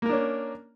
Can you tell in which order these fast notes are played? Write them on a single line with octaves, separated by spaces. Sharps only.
A#3 A#4 D4 C#4